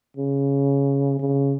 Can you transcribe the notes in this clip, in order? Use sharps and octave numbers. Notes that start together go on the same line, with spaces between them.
C#3
C#3